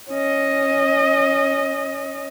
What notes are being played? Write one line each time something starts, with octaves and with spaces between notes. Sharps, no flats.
C#4 D#5